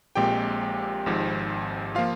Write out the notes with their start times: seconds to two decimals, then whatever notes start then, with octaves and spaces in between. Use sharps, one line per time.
0.15 A#1 A#2 G#3 C4 G4 G5
1.06 G#1 G#2 F3
1.95 F3 A#3 F4 F5